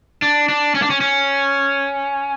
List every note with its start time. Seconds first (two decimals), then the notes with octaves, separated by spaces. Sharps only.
0.22 D4
0.49 D4
0.75 C#4
0.82 D4
0.90 C#4
1.01 C#4